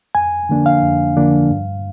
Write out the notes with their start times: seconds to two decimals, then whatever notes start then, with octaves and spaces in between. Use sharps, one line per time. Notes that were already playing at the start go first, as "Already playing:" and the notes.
0.15 F2 G#5
0.49 D3 F3 A#3 D4
0.66 F5
0.83 F2
1.17 D3 F3 A#3 D4
1.50 G2